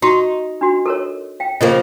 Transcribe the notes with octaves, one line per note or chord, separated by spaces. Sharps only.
D#4 F#4 C#6
D4 F#4 C6
A4 A#4 C#5
F5 G5
C#3 F3 A#3 D#5